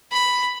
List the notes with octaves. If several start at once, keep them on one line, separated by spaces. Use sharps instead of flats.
B5